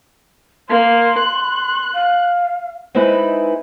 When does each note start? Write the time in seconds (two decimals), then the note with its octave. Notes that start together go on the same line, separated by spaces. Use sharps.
0.69 A#3 C6
1.18 F#6
1.94 F5
2.95 G#3 C4 D#4 E4 B4